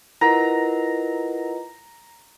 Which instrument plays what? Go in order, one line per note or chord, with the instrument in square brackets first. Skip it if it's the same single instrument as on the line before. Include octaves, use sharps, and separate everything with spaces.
[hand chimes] E4 A#4 F#5 [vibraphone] F4 B4 D#5 [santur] A#5